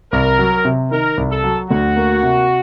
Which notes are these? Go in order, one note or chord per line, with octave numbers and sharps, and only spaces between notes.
C2 A#4
F#3
C3
D#3 A#4
C2
A4
F#3
D2 F#4
A#3
C3